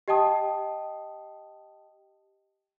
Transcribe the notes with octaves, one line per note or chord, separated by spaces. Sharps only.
G4 D#5 G5 A5 D#6